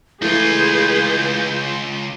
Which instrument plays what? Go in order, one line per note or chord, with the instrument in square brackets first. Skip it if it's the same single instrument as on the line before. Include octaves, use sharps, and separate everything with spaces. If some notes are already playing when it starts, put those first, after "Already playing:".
[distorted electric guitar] C#2 F4 [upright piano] E3 A3 [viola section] G#4 B4 [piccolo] G6